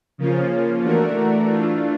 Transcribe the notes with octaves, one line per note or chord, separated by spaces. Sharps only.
C#3 F3 A#3 C#4 F4
E3 A3 D4 F#4 A#4
E3 A3 D4 F4